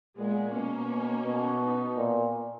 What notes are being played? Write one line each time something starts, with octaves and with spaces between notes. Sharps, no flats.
A#2 G#3 B3
B2 A#3 C#4
B2
B3 D#4
A#2